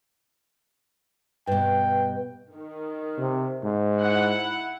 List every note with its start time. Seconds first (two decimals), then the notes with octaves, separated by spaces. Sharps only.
1.47 G2 B2 G5
2.53 D#3
3.18 C3
3.64 G#2
3.98 E4 F#5